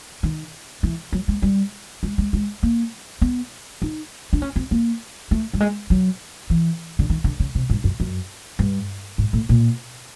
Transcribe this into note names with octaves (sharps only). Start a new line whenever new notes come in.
D#3
E3
F#3
G#3
G3
G#3
G#3
G#3
A#3
B3
D#4
D4
C#4
C4
A#3
A3
G3
G#3
F#3
E3
D3
D#3
D3
C#3
C3
G2
F#2
F#2
G2
G#2
A2
A#2